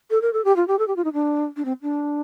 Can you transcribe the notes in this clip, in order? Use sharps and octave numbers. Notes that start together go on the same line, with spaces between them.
A4
A#4
A4
G4
F4
G4
A4
G4
F4
D#4
D4
D4
C4
D4